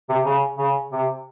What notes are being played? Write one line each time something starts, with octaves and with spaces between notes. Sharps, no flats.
C3
C#3
C#3
C3